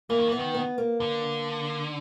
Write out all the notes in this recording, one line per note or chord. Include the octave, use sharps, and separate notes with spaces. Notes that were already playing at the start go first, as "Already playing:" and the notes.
E3 A#3
D#3
E3
B3
D#3
B3
A#3
D3